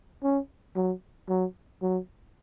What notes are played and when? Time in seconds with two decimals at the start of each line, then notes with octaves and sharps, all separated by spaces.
0.23 C#4
0.76 F#3
1.29 F#3
1.82 F#3